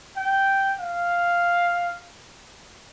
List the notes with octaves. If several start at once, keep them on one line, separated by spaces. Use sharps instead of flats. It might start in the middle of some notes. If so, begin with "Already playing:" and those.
G5
F5